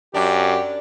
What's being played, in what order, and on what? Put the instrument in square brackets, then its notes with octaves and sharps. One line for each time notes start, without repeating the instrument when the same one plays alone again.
[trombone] F#2 [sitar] D4 [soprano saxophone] G4